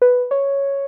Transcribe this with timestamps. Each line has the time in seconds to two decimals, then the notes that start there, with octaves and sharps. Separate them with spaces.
0.02 B4
0.31 C#5